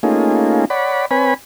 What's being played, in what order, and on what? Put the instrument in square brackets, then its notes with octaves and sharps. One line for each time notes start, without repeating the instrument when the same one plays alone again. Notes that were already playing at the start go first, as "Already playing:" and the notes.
[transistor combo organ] A3 A#3 C#4 D#4 F4 G#4
C#5 D5 F#5 B5
C4 B4 C#5 G#5 B5